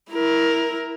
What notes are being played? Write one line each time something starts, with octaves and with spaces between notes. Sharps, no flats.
E4 A#4